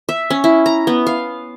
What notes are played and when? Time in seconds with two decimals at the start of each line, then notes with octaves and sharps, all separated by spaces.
0.09 E5
0.30 C#4
0.44 E4
0.66 A#5
0.87 B3
1.07 F5